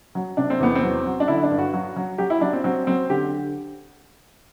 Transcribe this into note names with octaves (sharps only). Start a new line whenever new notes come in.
F#3
C3 D4
C4
E2 B3
C4
F#3
F#3
D4
D3 E4
D4
G2
F#4
F#3
F#3
F#3 G4
E4
F#3 D4
C4
F#3 C4
F#3 C4
D3 G4